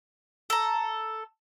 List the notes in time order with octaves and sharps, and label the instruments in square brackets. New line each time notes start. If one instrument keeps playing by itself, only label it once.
[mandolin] A4 A#5